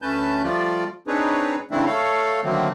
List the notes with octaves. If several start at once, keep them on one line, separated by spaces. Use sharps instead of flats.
D2 A3 C#4 B4 A5 G6
F3 G3 A3 F4 D5
C4 D4 D#4 G#4 B4 C#5
C#3 E3 A3 C4 D4 E4
A3 A4 C#5 F5
D3 D#3 F#3 A3 A#3 C4